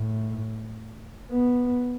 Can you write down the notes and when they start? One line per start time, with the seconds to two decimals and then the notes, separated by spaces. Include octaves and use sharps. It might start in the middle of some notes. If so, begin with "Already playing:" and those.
Already playing: A2
1.31 B3